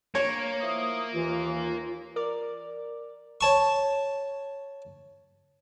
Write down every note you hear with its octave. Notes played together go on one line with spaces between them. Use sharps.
A#3 C#5
F3 E4 D#6
D#2 E3 F4
A#4 D5
C#5 A5 C#6